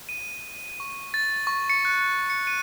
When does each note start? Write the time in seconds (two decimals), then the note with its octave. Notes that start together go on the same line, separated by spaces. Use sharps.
0.09 D#7
0.80 C#6
1.14 A6
1.47 C#6
1.70 C#7
1.85 F#6
2.30 C#7
2.47 D#7